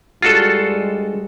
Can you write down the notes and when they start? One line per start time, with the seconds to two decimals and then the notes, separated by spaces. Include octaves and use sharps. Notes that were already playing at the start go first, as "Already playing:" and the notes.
0.22 G2 G3 G#3 F4 F#4 A4